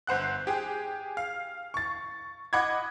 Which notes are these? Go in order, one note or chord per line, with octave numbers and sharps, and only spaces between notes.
G1 C5 F#5 F#6
G4 G#4
F5
C#6 A6
D#5 F#5 B5 D6 G#6